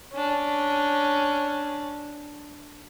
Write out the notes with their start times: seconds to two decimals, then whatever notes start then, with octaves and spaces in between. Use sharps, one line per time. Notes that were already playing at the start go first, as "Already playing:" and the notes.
0.13 C#4 D4